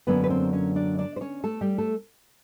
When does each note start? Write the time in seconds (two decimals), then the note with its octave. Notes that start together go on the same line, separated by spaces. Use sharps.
0.07 F#2 D3 F#3 A#3 B3 C#4 B4
0.24 B4
0.30 C4 C5
0.53 C#4 C#5
0.75 D4 D5
0.98 D4 D5
1.16 C5
1.21 C#4 C#5
1.44 A3 A4
1.61 G3 G4
1.78 A3 A4